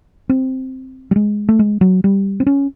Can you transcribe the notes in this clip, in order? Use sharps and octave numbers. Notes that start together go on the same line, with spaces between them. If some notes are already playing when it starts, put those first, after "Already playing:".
C4
G3
G#3
A3
G#3
F#3
G3
C4
C#4